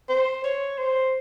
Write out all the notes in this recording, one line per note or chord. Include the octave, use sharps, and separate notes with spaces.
C5
C#5
C5